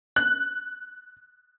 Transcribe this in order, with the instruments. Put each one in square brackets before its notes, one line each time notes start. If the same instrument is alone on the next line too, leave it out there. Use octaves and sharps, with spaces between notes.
[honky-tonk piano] F#6